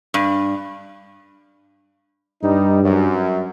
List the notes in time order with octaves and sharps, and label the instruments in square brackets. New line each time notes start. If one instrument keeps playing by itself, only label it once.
[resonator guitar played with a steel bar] G2
[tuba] G2 [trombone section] G3 D#4
[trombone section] F#2